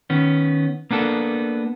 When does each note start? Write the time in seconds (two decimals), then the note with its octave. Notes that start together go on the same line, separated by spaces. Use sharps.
0.10 D#3 B3 C#4
0.91 A#3 B3 D4 A4